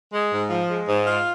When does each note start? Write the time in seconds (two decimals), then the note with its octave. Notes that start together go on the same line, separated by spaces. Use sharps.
0.13 G#3
0.32 G#2
0.50 F3
0.70 G#3
0.88 G#2
1.07 F4